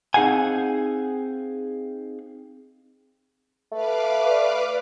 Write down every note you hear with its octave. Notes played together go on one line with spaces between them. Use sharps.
C4 D#4 G#4 F5 F#5 G#5
A3 B4 F5 D6
D5